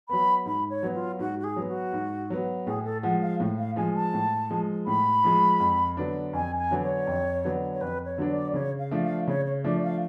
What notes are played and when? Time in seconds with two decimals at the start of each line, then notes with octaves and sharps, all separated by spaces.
0.09 F#3 B3 B5
0.46 G#2 B5
0.70 C#5
0.83 F#3 B3
0.94 F4
1.19 G#2 F#4
1.39 F#4
1.44 G#4
1.56 F#3 B3
1.68 F#4
1.93 G#2
2.30 F#3 B3
2.66 A2 G#4
2.85 A4
3.03 F3 G#3 F#5
3.22 F5
3.40 A2
3.58 F5
3.76 F3 G#3 G#5
3.95 A5
4.14 A2
4.50 F3 G#3
4.86 A2 B5
5.24 F3 G#3
5.60 F2
5.97 D3 F#3 B3 D4
6.33 F2 G#5
6.58 G#5
6.71 D3 F#3 B3 D4
6.83 C#5
7.07 F2
7.44 D3 F#3 B3 D4
7.74 C#5
7.81 F2 B4
8.05 C#5
8.18 D3 F#3 B3 D4
8.30 D5
8.54 C#3 C#5
8.79 F5
8.91 F3 A3 D4
9.03 F5
9.27 C#3 C#5
9.46 C#5
9.64 F3 A3 D4 D5
9.83 F5